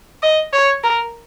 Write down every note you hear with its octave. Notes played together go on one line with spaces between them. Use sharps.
D#5
C#5
A#4